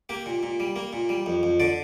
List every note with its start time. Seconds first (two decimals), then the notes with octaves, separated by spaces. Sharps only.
0.09 A#3 G4
0.26 A#2
0.43 A#2
0.60 G3
0.76 A#3
0.93 A#2
1.09 G3
1.26 F2
1.43 F2
1.60 D3 D5